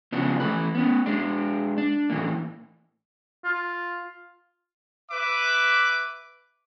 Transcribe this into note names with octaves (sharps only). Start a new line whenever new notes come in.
C#3 F3 B3 C4 D4
E3 A3 B4
B3 C#4
G#3 D4
D4
A2 E3 A#3
F4
B4 E5 D6